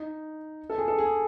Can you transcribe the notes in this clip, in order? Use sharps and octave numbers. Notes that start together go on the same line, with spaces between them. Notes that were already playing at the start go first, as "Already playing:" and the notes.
Already playing: D#4
A4
G#4
A4
G#4